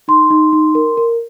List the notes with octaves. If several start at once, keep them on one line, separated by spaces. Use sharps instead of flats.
D#4 C6
D#4
D#4
A#4
A#4